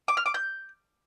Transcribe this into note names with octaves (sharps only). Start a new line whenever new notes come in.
D6
F6
D6
G6